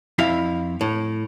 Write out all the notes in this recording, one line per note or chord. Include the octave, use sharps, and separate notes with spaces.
F2 E4 F5 B5
A2